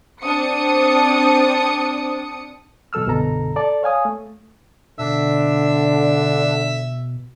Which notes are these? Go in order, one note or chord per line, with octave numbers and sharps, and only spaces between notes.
C4 D4 D#6 C#7
B2 F#3 A4 E6 F6
C2 G2 B2 D3 A4 A#5
A4 D5 A5
C#5 F5 G#5 D#6
A3
B2 D3 D4 E5